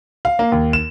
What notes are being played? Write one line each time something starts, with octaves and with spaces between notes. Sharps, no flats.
F5
A#3
D#2
E7